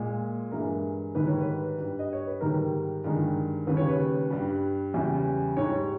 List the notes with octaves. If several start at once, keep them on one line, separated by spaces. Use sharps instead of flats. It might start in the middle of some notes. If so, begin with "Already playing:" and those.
Already playing: A#2 G#3
G2 E3 G#3 A#4
G#2 D#3 G3 B4
C#5
B4
G2 G3
D#5
C#5
B4
G#2 D#3 G3 A#4
G2 D#3 G#3
D#2 C#3 G3 B4
C#5
B4
G2 G3
E2 C#3 G3
G#2 G3 C#5